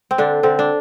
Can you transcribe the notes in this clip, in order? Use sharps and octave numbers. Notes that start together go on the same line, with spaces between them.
C4
D3 D4
D3 C4
D4